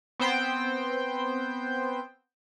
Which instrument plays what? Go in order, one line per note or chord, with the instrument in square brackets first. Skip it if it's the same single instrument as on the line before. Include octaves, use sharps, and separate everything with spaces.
[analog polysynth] B3 C4 C5 G5